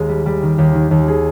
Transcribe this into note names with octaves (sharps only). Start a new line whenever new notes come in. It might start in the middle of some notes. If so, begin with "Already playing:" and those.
Already playing: D#2 G#3
G3
G3
D#3
D#2 G4
D#3
D#2
G#4